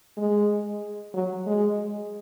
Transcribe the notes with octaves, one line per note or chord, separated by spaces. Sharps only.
G#3
F#3
G#3